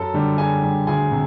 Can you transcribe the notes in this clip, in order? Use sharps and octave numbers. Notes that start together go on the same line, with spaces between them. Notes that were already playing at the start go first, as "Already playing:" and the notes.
Already playing: F#2 A4 A5
D3 G3
F#2 G#4 G#5
D3 G3
D2 G#4 G#5
C3